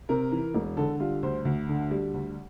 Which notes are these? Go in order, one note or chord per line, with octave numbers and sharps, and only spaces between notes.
C3 A#4
E3
E1
D3 A4
G3 F4
D2 C5
D2
D3
G3
D2